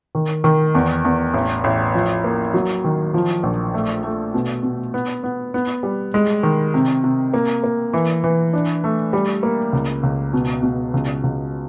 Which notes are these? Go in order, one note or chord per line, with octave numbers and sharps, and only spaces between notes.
D#3
D#3
E2
E2
A1
A1
F3
A#3
F#3
D#3
F3
A#1
A3
A3
B2
B2
B3
B3
B3
G3
G#3
D#3
C3
C3
A#3
A#3
E3
E3
D4
A3
G3
A#3
C#2
C#2
B2
B2
C#2
C#2